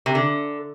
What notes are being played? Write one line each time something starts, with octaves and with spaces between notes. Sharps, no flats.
C3
D3